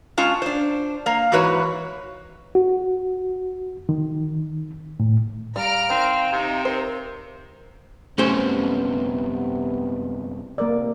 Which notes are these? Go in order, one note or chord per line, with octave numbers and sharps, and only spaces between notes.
G#3 C#4 F4 A5
D4 C5
A#3 F5
G#2 E3 F#4 B4 C#5
F#4
D#3
A2
G3 F5 A#5 F6 D7
D#3 C4
C3 D#4
A#4 C5
C2 F#2 C3 A3 B3 C#4 G4 C5
A2 C3 A#3 A#4 D5